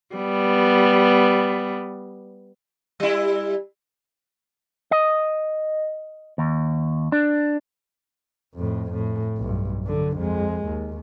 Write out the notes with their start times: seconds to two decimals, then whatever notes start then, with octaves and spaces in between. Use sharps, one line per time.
0.16 G3 B3
3.00 G3 E4
4.91 D#5
6.38 D#2
7.12 D4
8.55 F2 A2
8.93 A2
9.37 B1 G2
9.83 D3 F#3
10.17 F2 G#3
10.65 D#2